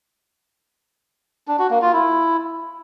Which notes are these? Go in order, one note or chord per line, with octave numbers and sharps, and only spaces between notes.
D4
F#4
A#3
F4
E4